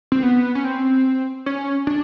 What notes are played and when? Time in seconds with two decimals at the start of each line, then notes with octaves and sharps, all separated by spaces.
0.12 C4
0.23 B3
0.55 C#4
0.65 C4
1.46 C#4
1.87 D4